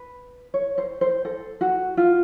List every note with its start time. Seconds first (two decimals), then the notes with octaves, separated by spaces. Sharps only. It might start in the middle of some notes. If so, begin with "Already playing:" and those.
Already playing: B4
0.54 C#5
0.78 C5
1.01 C5
1.25 A4
1.61 F#4
1.97 F4